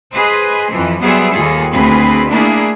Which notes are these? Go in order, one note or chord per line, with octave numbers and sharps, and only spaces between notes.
G#4 B4 C5 D#5
F2 E3 F3
F#3 G3 B3 G#4 C5 E5
D#2 F4 G#4 A4
D2 C4 G#4 B4
A3 A#3 D4 E4 G#4